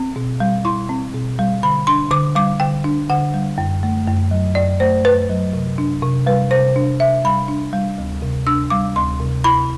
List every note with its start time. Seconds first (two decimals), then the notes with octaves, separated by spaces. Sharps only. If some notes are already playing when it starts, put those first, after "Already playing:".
Already playing: C4
0.16 B2
0.40 G3
0.65 E4 C6
0.89 C4
1.14 B2
1.39 G3
1.63 D3 B5
1.87 D4 C6
2.11 D3 D6
2.35 G3 D6
2.60 D3 G5
2.84 D4
3.10 D3 F#5
3.34 G3
3.58 F#2
3.83 A3
4.07 F#2
4.31 F#3
4.55 F#2 D5
4.80 A3 C5
5.04 F#2 B4
5.29 F#3
5.53 C3
5.78 D4
6.02 C3
6.26 G3 B4
6.51 C3 C5
6.76 D4
7.00 C3 E5
7.24 G3 B5
7.48 D4
7.73 G3
7.98 D2
8.22 C3
8.47 D4 E6
8.70 G3 D6
8.96 D2 C6
9.20 C3
9.44 E4 B5